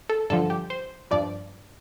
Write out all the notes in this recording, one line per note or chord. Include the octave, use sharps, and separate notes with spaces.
A4
G2 D3 F3 A4
G4
C5
G2 F3 D5